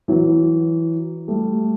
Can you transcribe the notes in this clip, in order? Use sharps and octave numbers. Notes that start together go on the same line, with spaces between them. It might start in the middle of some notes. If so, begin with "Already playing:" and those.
E3 F#3
G3 A3